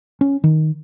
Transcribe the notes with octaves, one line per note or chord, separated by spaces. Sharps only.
C#4
D#3